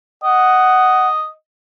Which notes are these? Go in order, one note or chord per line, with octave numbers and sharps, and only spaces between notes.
D#5 F#5